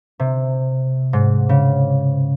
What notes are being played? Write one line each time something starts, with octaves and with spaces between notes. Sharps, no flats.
C3
G#2
C#3